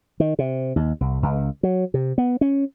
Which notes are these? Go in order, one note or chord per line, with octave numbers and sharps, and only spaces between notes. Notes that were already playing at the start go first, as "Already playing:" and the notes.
D#3
C3
D#2
C2
C#2
F#3
C3
B3
C#4